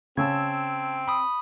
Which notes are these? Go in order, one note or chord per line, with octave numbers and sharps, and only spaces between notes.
C#3 C4 A5 E6 G#6
B5 D#6